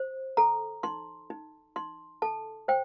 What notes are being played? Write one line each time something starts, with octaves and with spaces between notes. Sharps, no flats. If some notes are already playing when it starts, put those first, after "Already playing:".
Already playing: C5
A4 A#5
D#4 C6
D#4
D#4 C6
A4 A5
C5 G5